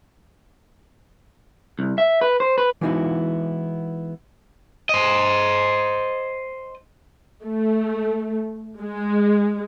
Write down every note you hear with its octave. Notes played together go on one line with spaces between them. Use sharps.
C2
E5
B4
C5
B4
E3 G#3 B3 D#4 E4 F#4
C5 D#5
A3
G#3